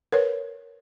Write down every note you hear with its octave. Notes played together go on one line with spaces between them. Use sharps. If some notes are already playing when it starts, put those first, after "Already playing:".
A#4 B4 C#5